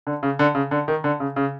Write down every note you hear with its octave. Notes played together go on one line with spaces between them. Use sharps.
D3
C#3
D3
C#3
D3
D#3
D3
C#3
C#3